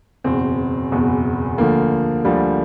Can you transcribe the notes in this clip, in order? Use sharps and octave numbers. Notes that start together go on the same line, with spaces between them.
F#1 E2 B2 C4
F#1 E2 B2
D2 D3 F3 A#3
D2 D3 F3 G3